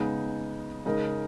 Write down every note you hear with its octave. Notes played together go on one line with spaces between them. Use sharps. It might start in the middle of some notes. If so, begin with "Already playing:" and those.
Already playing: C#3 G#3 B3 D#4
C#3 G#3 D#4 A#4 D#5